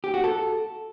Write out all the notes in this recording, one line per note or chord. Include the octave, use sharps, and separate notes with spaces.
G4
F#4
A4